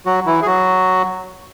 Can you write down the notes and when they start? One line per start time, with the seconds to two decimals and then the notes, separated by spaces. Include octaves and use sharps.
0.06 F#3 F#4
0.26 E3 E4
0.42 G#4
0.46 F#3 F#4